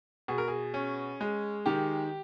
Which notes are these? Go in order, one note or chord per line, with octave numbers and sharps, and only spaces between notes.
B2 G#4
A#4
G#4
C#4
G#3
D#3 G4